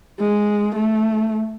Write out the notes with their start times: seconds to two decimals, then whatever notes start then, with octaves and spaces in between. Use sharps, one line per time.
0.20 G#3
0.75 A3